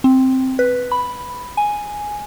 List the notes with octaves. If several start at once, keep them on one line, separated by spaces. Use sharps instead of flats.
C4
B4
B5
G#5